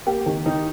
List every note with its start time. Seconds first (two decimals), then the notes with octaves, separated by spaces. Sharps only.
0.07 A#3 G4
0.26 D#3
0.46 D#3 D#4